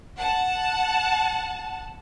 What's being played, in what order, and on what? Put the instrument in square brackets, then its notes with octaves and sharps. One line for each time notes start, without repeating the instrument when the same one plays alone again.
[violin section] F#5 A5